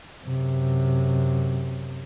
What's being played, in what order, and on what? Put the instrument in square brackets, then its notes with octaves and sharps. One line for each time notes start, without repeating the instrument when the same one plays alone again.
[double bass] F#2 C3